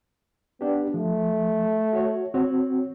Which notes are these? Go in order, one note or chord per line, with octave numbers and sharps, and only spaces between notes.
B3 D4 G4
F3 A3
F#4 C#5
C4 F#4 C#5